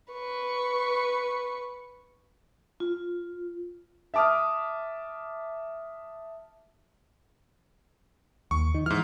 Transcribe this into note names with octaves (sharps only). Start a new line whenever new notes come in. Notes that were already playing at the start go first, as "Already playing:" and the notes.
B4 C#6
F4
E5 A5 D6 D#6 F6
D#2 C#6
D#3
G#2 E3 F6